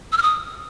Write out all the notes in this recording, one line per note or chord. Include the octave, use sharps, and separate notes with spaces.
E6
F6
D#6